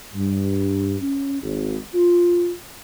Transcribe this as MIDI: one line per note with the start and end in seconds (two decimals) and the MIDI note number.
0.14 0.97 43
1.01 1.40 61
1.42 1.76 32
1.94 2.50 65